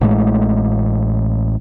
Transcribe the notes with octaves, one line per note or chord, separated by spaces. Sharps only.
A1 A2 G#3